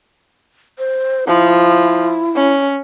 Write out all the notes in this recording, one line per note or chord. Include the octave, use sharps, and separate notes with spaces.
C5
F3 E4
C#4